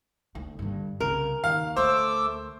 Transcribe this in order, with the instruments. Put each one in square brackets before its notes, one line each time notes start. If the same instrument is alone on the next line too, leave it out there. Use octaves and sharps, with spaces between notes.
[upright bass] D2
G2 D3
[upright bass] C2 C#3 [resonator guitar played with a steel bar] A#4
[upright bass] D#2 [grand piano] F5
[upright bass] D2 [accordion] A3 D6 E6 [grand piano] C5